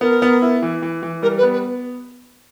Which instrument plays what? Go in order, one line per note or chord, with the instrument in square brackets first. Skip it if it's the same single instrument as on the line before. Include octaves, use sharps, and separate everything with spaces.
[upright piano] B3 [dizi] A#4
[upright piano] B3
E4
E3
E3
E3
[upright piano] G3 [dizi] A#4
[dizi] B4
[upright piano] B3
[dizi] B4